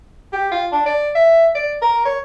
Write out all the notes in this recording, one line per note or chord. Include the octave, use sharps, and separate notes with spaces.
G4
F4
D4
D5
E5
D5
A#4
C#5